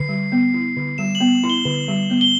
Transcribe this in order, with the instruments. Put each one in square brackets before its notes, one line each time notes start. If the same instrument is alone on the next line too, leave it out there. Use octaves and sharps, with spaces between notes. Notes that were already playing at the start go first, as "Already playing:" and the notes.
Already playing: [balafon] D3 [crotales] C7
[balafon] G3
B3
E4
D3
[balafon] G3 [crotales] E7
[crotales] F#7
[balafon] B3
E4
[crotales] G7
[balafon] D3
G3
B3
[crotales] G7